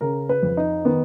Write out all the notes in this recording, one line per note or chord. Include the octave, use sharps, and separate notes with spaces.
C#3 A#4
B4
F2
D#4
D#3 B3